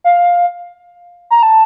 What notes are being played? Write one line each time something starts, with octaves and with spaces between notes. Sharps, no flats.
F5
A#5
A5